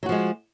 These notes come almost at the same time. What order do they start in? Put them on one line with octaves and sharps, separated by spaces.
F#3 F#4 F3 G#3